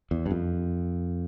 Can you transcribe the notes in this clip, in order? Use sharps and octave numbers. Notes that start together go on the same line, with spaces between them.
E2
G2
F2